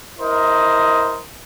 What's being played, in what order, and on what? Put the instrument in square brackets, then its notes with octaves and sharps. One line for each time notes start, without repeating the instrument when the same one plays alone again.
[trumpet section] E4 A#4 C5 D#5